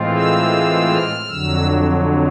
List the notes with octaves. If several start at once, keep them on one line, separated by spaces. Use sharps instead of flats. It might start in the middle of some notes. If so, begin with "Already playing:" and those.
Already playing: A2 E3 G#3 C4 F4
E6
F6
F2 D3 F#3 E6